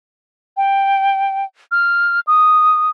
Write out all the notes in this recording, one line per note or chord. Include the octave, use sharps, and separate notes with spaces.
G5
F6
D#6